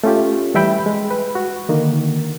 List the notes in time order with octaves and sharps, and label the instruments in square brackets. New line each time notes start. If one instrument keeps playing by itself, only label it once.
[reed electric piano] A3 C#4 F4 G4
E3 G3 E5 G5 B5
G#3
B4
F#4
D3 D#3 A#3